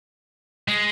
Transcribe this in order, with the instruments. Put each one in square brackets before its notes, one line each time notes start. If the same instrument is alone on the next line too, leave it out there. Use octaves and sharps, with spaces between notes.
[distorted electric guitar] G#3